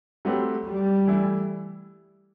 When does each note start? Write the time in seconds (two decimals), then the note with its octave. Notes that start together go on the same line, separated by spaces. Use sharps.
0.25 F#3 A3 C4 G4 B4
0.67 G3
1.07 E3 A3 E4